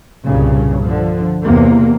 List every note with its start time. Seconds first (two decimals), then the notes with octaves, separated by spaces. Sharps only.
0.25 C2 G2 A#2 C#3
0.83 D3 F3
1.44 E2 C3 A#3